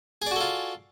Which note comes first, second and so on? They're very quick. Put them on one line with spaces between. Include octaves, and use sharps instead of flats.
G#4 D5 F#4 A4 F4